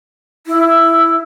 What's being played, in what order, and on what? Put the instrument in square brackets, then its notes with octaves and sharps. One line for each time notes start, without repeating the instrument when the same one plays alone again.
[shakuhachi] E4